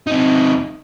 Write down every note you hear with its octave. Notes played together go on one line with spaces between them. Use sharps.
C3 D#4